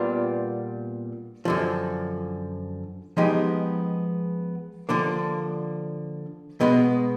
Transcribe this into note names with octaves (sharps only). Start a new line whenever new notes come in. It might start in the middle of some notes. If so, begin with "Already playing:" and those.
Already playing: A#2 G3 B3 D4 F4
F#2 D3 F3
F3 G#3 B3 D#4 G4
D3 F3 A#3 D4
B2 G#3 B3